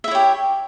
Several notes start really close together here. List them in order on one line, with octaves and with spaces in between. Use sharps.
E5 E4 C#5 G4